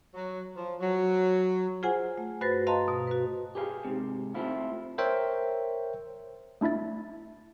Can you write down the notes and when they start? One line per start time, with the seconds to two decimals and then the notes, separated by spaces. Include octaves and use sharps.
0.14 F#3
0.57 F3
0.81 F#3
1.83 F4 G#4 C5 F#5 G#5
2.18 A3
2.41 G2 F#4 B4 C5 A6 A#6
2.67 D#5 F5 A5 A#5 C6
2.88 B2 D#6
3.07 F#4 B4
3.55 G4 G#4 B4 F5
3.85 G#2 C3
4.34 A3 C4 E4 F4
4.98 A#4 C5 C#5 E5 G5
6.61 A3 D4 E4 E5 A6